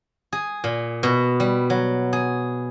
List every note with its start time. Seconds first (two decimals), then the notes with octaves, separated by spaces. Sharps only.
0.32 G#4
0.64 A#2
1.03 B2
1.40 G3
1.70 F#3
2.13 G#4